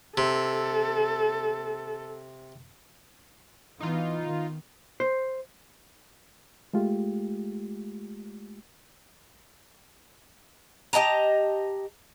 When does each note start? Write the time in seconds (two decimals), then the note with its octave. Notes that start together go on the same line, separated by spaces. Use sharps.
0.17 C3 A4
3.81 E3 B3 D#4 F4
4.26 D#3
5.00 C5
6.74 G#3 A3 F4 G4
10.93 G4 D#5 A5 A#5